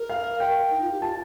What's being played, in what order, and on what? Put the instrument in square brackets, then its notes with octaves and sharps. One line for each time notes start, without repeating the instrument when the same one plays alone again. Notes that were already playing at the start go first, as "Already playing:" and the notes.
Already playing: [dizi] A#4
[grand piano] F5
G5
[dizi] D#4
F4
G4
[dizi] F4 [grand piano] A5